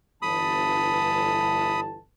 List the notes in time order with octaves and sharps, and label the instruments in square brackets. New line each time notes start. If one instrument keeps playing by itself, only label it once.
[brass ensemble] G1 E3 A5 [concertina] B5 D#6